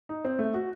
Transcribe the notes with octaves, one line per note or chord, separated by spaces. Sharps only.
D#4
C4
A3
F#4